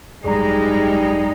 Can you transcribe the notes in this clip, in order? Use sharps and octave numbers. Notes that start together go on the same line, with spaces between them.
G#1 F#2 G3 G#3 D#4 G#4 D5 A#5